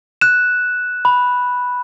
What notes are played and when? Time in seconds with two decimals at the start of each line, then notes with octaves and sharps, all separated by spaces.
0.21 F#6 E7
1.05 B5